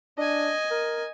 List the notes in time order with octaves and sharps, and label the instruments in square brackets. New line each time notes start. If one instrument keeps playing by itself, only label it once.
[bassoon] D4 [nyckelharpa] D#5 G#5
[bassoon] A#4